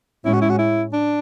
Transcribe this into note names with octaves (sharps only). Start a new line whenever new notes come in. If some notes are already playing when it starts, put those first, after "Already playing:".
A2 G#3 C#4 E4
F#4
E4
F#4
E4
D4